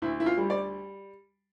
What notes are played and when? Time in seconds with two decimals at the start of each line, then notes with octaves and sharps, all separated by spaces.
0.02 D2 E4
0.20 E4
0.26 F4
0.38 G3
0.50 D5